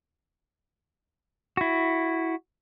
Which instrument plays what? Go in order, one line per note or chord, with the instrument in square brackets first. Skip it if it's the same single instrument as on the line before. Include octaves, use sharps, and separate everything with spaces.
[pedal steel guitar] E4 F#4